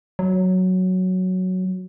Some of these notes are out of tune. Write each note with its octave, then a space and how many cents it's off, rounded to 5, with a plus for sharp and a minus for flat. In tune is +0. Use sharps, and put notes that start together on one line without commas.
F#3 +0